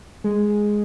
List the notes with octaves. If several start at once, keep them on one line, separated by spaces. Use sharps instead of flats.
G#3